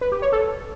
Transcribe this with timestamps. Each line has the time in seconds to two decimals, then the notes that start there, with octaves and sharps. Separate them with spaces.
0.01 B4
0.12 G4
0.22 C#5
0.32 A4